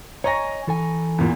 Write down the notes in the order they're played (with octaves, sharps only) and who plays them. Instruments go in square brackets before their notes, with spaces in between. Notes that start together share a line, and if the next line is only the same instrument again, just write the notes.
[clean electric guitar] C#5 D#5 G#5 [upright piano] A#5 C#6 A#6
[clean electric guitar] E3 A4 G#5
[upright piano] E2 A#2